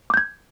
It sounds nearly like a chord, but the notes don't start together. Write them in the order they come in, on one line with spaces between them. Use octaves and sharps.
D6 G6 G#6